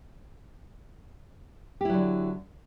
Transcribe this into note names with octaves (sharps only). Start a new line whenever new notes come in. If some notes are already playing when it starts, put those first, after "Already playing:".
D3 F#3 E4 G4